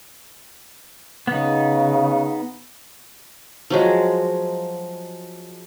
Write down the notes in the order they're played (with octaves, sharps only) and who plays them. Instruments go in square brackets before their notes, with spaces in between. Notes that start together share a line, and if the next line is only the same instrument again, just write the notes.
[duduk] C#3 [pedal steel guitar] B3 D#4
[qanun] F3 F#3 G#3